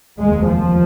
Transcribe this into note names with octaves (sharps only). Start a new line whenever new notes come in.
F1 D#2 G#3
F3